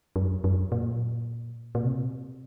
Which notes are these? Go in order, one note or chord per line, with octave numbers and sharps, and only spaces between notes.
F#2
F#2
A#2
A#2
C3